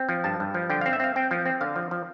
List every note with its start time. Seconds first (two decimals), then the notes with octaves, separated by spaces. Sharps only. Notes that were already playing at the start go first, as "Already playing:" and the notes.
Already playing: C4
0.09 F3
0.24 G2 A5
0.40 G2
0.54 F3
0.70 D3 G5
0.81 C4 F5
0.93 E5
1.00 C4 F5
1.16 C4 G5
1.31 F3
1.46 C4
1.61 D3 F5
1.76 F3
1.91 F3